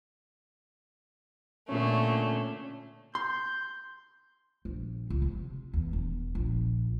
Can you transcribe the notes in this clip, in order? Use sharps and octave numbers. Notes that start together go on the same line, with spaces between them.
A#2 D3 A3 C#4
C6 G6
A#1
C#2
C3
E2
E1
A#1